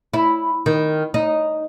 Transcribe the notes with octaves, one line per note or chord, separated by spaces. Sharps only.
E4
D#3
D#4